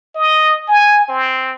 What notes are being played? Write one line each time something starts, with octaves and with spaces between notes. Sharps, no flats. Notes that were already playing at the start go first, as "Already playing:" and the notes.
D#5
G#5
C4